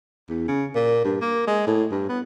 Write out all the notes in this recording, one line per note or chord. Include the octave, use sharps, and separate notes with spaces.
E2
C#3
A#2
G2
A#3
G#3
A2
G2
B3